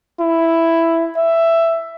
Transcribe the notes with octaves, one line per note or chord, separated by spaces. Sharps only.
E4
E5